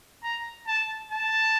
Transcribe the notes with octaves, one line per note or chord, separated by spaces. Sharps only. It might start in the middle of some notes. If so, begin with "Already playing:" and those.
A#5
A5
A5